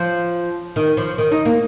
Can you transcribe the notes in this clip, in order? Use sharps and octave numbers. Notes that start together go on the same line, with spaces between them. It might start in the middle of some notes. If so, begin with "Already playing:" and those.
Already playing: F3
D#3
F3
D#3
D#4
A#3